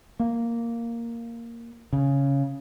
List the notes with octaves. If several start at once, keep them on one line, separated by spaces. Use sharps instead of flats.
A#3
C#3